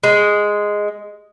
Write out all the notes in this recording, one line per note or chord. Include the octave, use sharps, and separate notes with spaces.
G#3